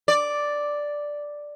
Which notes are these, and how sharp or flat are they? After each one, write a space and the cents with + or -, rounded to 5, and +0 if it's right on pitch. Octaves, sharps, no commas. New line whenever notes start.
D5 +0